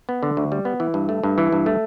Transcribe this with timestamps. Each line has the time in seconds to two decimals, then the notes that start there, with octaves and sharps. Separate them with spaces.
0.09 B3
0.23 D3
0.37 D2
0.52 G3
0.65 B3
0.80 E3
0.94 G2
1.09 A3
1.23 G2
1.38 E3
1.52 G2
1.66 A3